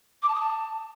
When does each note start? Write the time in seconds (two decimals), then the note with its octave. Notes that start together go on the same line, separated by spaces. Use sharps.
0.22 D6
0.28 A5
0.35 D#6
0.41 A5